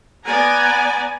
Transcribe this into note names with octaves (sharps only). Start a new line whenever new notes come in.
B3 D5 G#5 A#5